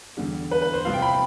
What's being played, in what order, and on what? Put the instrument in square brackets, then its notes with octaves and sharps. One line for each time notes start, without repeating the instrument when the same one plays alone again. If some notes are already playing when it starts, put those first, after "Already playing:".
[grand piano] E2 D3 G3
B4
B4
C5
C2 C3 F3 C4 F4 F5
G5
B5